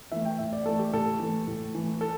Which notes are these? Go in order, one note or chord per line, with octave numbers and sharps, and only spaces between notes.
E3 A3 E5
G5
A2 E5
D5
E3 A3 A4
G4
A2 A4
E3 A3
A2
E3 A3
A4